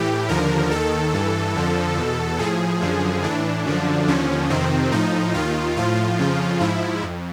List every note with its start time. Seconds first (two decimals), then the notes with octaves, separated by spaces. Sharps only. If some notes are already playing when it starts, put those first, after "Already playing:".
Already playing: A2 E3 G4
0.29 D#2 D3 F3 A#4
0.71 D#2 D#3 A4
1.14 G2 E3
1.55 F2 D3 F3
1.97 E2 B2
2.39 A2 F3 G#4
2.82 F#2 D3 F3
3.24 A2 E3 D4
3.66 F#2 D3 F3
4.08 D#2 D3 F3 C#4
4.50 F2 C3 D#3 C4
4.92 A2 F3 D#4
5.34 D#2 D#3 F4
5.77 A2 F3 F4
6.19 F2 C#3 F3
6.60 G#2 F3 E4
7.02 F2